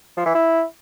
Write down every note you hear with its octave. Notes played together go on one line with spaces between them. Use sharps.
F3
E3
E4